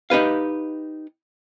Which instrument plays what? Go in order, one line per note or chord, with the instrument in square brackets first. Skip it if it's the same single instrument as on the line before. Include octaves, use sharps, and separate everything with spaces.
[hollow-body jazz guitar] D#4 G4 B4 F5